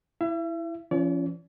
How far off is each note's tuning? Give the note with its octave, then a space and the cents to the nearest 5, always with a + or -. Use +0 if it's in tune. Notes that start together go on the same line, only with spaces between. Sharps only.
E4 +0 E5 +40
F3 -40 C#4 +0 D5 -45